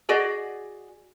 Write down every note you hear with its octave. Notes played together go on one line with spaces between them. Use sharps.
F#4 G#4 D5 D#5